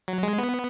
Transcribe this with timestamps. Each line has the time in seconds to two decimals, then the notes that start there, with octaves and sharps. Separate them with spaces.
0.08 F#3
0.23 G#3
0.38 B3